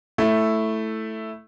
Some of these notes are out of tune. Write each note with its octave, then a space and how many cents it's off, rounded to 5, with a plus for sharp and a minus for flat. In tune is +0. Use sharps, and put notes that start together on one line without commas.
A3 +0 E4 +0